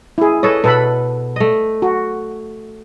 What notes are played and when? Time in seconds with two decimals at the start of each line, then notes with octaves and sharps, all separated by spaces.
0.18 E4 G#4
0.43 A4 B4 C#5 D#5
0.64 B2 A4 B4 B5
1.36 A3 D#5
1.82 F#4